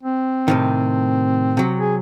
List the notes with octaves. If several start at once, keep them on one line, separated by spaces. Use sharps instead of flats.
C4
A2 C3 D#3
C3 F#3
G#4